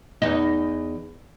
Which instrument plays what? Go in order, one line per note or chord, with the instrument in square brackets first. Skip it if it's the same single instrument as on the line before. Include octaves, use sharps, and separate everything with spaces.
[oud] E2 D#4